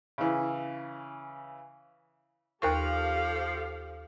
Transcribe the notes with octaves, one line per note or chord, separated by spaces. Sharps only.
C#3 E3
D#2 F3 G4 A4 A#4 F5 C#6